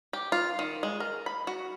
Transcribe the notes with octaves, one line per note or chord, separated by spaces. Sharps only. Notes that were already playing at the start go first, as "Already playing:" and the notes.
G4
F4
D#3
G#3
A#4
B5
F#4